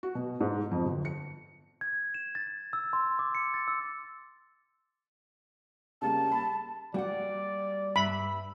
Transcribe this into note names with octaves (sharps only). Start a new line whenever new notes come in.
F#4
B2
G#2
F2
G1
C#7
G#6
E7
A6
E6
C6
D6
C#7
A6
E6
C#3 G3 A#3 A5
B5
G3 A#3 F#4 D5 F#5 G5
G2 E5 B5